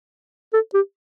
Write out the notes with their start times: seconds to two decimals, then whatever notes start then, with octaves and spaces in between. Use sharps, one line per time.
0.53 A4
0.74 G4